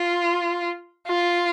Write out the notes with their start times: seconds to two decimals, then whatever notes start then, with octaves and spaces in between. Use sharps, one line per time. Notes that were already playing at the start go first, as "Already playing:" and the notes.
Already playing: F4
1.08 F4